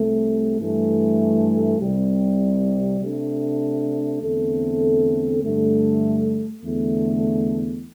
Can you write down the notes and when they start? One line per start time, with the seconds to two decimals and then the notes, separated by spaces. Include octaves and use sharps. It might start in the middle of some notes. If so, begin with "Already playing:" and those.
Already playing: C2 C3 A3
0.60 G2 E3 A3
1.80 C2 C3 G3
3.01 C3 A3 D4
4.22 E2 D3 A3 C4 A4
5.42 G2 D3 A3
6.62 E2 D3 A3